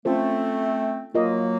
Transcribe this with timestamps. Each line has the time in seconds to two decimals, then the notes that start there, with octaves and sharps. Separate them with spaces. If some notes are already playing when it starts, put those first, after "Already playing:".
0.05 A3 C4 C#4 F4 A4 C5
1.14 F#3 A#3 F4 A#4 D#5